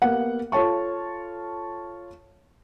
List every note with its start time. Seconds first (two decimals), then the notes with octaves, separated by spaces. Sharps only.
0.02 A#3 B3 G4 F#5
0.52 F4 A4 C#5 A5 C#6